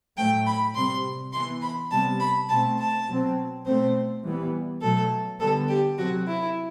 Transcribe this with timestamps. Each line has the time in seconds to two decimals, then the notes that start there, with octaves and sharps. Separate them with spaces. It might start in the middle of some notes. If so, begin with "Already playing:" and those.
0.17 A2 F#3 A3 G5
0.47 B5
0.75 C3 G3 C4 C6
1.33 E3 B3 C6
1.62 B5
1.91 C3 G3 B3 A5
2.20 B5
2.49 B2 A3 C4 A5
2.79 A5
3.07 B2 F#3 C4
3.66 B2 A3 C4 C5
4.24 E3 G3 B3
4.82 B2 F#3 A3 A4
5.40 D3 G3 B3 A4
5.69 G4
5.98 C3 F#3 C4 F#4
6.27 E4